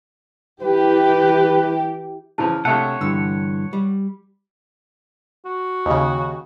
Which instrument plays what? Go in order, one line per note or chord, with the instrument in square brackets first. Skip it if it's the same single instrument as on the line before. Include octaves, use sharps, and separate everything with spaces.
[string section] E3 G4 [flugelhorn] B4
[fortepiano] C#3 E3 F3 [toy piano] E4 A5
[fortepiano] A#1 A3 E5 [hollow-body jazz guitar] C3 [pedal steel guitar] C#5 F#5 [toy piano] A5
[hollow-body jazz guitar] G2 D3 E3 [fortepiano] E6
[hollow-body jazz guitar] G3
[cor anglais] F#4
[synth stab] D#2 C#3